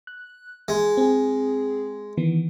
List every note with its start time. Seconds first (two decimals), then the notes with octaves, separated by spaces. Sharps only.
0.07 F#6
0.68 G#3 G#4
0.97 C4 G#4
2.17 D#3 E3 B3